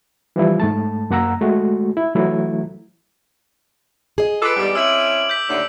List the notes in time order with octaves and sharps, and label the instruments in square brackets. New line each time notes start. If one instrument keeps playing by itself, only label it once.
[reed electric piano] E3 F3 G3 E4
G#2 A3 A5
F#2 A#3 F#5 A#5 E6
G#3 A3 F#4
E4
E3 F#3 A3 E4
[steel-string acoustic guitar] G#4 D#5
[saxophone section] F4 A4 B4 [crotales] D6 D7
[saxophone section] E2 G#2 G3
[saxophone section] C4 C#4 E4 [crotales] E6 F#7
[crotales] G6 B6
[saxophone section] D#2 A2 D3